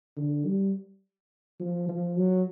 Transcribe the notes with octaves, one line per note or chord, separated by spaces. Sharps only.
D3
G3
F3
F3
F#3